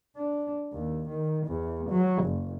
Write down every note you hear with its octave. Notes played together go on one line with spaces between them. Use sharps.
D4
D#2
D#3
E2
F#3
F#1